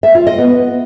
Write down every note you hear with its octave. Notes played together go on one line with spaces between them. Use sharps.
E5
F4
D#5
B3